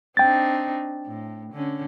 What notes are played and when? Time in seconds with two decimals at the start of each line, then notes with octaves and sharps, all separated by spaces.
0.17 C4 D4 D#4 G5 A6
1.06 A2
1.53 D3 C#4